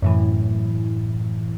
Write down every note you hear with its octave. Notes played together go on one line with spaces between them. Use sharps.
F#2 A2 E3